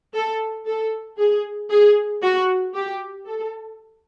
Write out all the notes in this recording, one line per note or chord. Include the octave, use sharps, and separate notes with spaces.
A4
A4
G#4
G#4
F#4
G4
A4